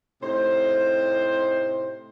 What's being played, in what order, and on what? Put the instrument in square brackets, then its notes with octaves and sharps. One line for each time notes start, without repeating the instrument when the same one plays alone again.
[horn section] A2 C3 D#4 C5